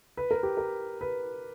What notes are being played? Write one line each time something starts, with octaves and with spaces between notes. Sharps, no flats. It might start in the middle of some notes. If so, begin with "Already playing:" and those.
B4
A#4
G4
A#4
B4